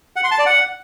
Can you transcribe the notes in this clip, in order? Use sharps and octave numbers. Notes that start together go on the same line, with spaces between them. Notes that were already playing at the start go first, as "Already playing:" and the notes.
F#5
C6
A5
D5
F#5